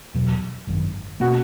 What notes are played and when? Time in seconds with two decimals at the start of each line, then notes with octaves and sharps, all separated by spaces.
0.14 E2 B2 F#3
0.67 G#1 F#2 D#3
1.20 B2 A#3 C#4 F#4